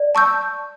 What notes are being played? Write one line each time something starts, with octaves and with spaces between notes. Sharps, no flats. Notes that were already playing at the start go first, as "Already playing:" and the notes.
Already playing: D5
A5 C#6 E6 G6